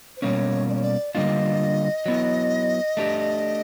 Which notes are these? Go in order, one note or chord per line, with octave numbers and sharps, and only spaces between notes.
C5
B2 G3 A#3 C#4 C#5
D5
C#5
D5
D3 G3 A#3 D4 F4 D#5
F#3 B3 E4
A3 D4 G4